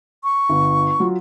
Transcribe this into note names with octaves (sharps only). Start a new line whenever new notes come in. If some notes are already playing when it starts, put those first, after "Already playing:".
C#6
G1
F#3 F4